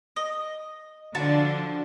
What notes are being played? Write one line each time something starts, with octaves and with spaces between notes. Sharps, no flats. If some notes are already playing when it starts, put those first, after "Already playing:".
D#5
D3 F3 D4 F#4 A5